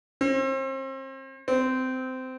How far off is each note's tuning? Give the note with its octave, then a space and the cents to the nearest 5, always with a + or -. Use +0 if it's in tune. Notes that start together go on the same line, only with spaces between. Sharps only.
C4 +35
C4 -20